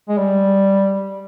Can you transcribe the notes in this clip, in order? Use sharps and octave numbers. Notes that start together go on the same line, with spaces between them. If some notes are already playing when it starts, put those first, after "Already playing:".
G#3
G3